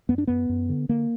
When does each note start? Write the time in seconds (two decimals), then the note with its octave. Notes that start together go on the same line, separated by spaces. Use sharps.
0.09 F#2 B3
0.18 D4
0.27 F#2 B3
0.49 F#2
0.69 D3
0.89 D3 A#3